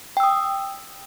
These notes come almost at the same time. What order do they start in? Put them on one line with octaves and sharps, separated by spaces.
G5 E6 D#6